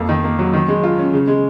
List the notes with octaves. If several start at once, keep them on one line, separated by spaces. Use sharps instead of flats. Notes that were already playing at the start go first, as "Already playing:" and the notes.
Already playing: F2 A#3
D#3
A#3
F#3
D#3
G#3
F4
C#4
C#3
G#3